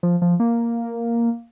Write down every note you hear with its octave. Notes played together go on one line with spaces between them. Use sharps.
F3
F3
A#3